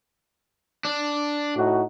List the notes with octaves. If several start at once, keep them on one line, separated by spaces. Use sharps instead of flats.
D4
A2 D#4 F#4